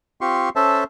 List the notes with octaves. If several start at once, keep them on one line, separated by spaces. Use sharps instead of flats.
C4 F4 G4 C6 C#6
C#4 A4 C5 E5 A5